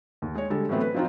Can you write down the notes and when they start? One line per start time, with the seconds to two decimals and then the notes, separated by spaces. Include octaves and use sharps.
0.22 D#2
0.35 G#3 C#5
0.50 D3 G3 G#3 A4
0.69 A2 E3 F#3 A3 B3 C4
0.81 B4
0.94 F3 F#3 C4 D#4 F4